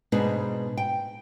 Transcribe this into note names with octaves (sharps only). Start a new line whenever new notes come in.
G#2 B2 D4 D#4 G#4 B4
G5